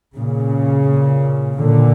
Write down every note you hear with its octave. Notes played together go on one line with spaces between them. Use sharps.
A#2 C#3
A#2
A#2 D3